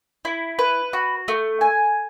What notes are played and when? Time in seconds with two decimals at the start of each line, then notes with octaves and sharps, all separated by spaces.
0.25 E4
0.59 B4
0.93 F#4
1.28 A3
1.61 G#5